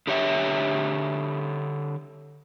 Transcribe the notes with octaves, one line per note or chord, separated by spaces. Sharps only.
D3 G4 C#5 E5